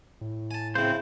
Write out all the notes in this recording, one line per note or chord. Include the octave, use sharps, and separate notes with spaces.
A2
G#5 A5
C#3 C4 E4 C5